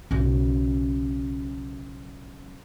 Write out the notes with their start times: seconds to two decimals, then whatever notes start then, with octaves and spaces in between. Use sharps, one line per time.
0.11 B1 C#3